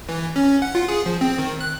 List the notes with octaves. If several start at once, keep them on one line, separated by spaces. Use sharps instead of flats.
E3
C#4
F#5
F4
G#4
F3
C4
D#3
F#6